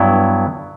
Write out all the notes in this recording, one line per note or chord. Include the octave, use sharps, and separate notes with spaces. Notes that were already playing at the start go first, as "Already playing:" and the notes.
Already playing: G2 F#3 B3 E4